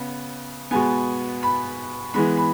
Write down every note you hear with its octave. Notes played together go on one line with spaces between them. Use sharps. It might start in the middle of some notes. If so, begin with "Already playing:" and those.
Already playing: C#3 B3
B2 G#3 B3 G#5
B5
E3 G#3 B3 B5
B5